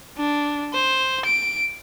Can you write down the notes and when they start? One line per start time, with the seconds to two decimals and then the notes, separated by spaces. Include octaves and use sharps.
0.17 D4
0.73 C5
1.26 D7